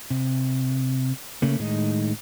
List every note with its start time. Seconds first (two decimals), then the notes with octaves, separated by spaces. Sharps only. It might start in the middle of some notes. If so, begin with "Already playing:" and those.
0.10 C3
1.42 C#3 A3 A#3
1.59 A2 D#3 G#3 D#4